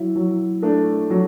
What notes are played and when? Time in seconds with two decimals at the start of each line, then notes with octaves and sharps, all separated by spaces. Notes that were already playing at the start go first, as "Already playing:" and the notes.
Already playing: F#3 E4
0.16 F#3
0.62 A3 D4
1.10 F#3